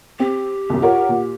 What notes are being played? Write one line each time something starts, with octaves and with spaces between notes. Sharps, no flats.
C4 G4
C2 F#2
F4 A#4 C#5 F#5
A#2